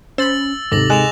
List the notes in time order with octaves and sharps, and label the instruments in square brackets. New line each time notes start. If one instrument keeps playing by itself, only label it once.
[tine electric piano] C#4 [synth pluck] C5 B5 [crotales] E6 A6 F#7
[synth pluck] D#2 G#2 [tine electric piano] C3 D#4 A4 [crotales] D6 A#6 F#7
[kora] G#3 [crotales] F#6 E7 F7